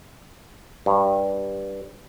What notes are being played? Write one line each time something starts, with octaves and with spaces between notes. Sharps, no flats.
G2